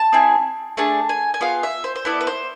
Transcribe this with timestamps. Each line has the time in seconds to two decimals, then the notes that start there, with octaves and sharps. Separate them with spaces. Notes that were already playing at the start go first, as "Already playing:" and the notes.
Already playing: A5
0.13 C4 E4 G#4
0.77 A3 D4 G#4 A5
1.09 G#5
1.34 G#5
1.41 B3 F4 G#4 F5
1.63 E5
1.84 C5
1.96 C5
2.05 B3 E4 A4 D5
2.21 B4
2.27 C5